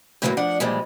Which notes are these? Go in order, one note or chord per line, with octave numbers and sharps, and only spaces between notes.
A2 D3 E3 F#3 A3 A#3
F3 D4 F#5
G2 A#2 E3 F3 G3 G#3